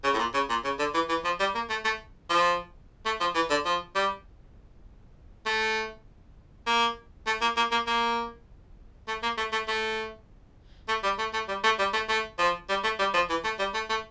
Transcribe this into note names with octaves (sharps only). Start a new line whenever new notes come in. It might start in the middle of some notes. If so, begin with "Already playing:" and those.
C#3
A2
A#2
C#3
A#2
C#3
D3
E3
E3
F3
G3
A#3
A3
A3
F3
A3
F3
E3
D3
F3
G3
A3
A#3
A3
A#3
A#3
A#3
A#3
A3
A#3
A3
A3
A3
A3
G3
A3
A3
G3
A3
G3
A3
A3
F3
G3
A3
G3
F3
E3
A3
G3
A3
A3